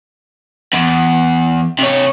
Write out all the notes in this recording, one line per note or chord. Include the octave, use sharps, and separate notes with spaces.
E2
C3 C#5